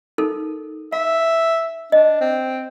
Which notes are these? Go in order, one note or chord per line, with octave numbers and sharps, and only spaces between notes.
D#4 A4 A#4
E5 F5
D4 D#5
C4